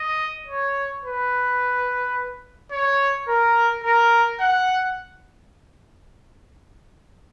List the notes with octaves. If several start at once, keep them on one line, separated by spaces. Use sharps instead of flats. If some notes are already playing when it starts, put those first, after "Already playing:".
Already playing: D#5
C#5
B4
C#5
A#4
A#4
F#5